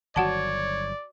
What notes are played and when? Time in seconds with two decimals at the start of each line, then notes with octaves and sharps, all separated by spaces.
0.16 G1 D#3 F#3 F#4 C#5 D5 F#5 A5